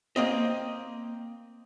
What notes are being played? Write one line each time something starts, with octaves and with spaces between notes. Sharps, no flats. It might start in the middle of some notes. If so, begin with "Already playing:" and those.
A#3 C4 D#5